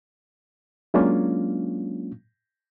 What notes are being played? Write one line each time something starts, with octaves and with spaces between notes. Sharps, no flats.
F#3 G#3 A#3 C#4 D4 F4